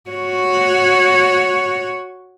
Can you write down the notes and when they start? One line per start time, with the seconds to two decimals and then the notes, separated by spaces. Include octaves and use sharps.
0.10 F#4 C#5